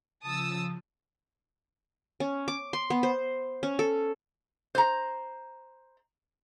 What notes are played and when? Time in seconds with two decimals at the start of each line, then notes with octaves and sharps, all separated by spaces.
0.23 C#3 F3 A5 D#6 E6
2.20 C#4
2.48 D6
2.73 C6
2.90 B3
3.03 C5
3.63 C#4
3.79 A4
4.75 C5 A#5